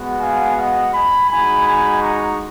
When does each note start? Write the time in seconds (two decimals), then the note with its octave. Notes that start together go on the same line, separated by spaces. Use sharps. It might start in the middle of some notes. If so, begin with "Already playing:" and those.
Already playing: G#3 B3 F#4
0.21 F5 G#5
0.57 D#5 F#5
0.94 G#5 B5
1.30 G#3 D#4 F#4 G#5 B5
1.67 G#5 B5
2.02 A#5 C#6